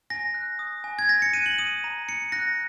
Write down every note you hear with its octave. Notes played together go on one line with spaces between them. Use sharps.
G#5 A#6
F#6
D#6
G#5
G#6
G#5 A#6
C#7
F#6 D#7
F#7
D#6 D#7
A#5
A#5 C#7
F#6 A#6